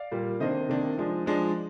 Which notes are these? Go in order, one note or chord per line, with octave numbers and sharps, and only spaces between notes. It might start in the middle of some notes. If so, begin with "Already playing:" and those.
Already playing: D5 F5
A#2 G3 A#3
C3 D#3 A#3 D4 C5 D#5
C3 D#3 A#3 D4
F3 G#3 D4
F3 G#3 D4